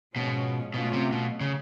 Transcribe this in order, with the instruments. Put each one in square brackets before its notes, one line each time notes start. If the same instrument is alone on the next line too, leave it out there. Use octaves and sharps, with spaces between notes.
[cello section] G#2 F3 G#3 C#4 [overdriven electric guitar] B2
[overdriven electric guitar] B2 [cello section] F#3 A3 C#4 F4
[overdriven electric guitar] C3
B2
C#3